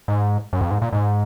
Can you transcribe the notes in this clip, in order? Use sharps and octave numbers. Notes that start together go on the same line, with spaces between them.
G#2
F#2
F2
G#2
A#2
G#2